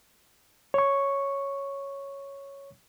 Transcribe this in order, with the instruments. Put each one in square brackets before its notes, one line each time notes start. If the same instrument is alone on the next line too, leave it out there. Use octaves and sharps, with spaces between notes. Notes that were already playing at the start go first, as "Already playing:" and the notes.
[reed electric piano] C#5 C#6